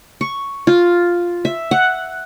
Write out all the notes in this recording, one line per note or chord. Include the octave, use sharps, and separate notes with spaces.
C#6
F4
E5
F#5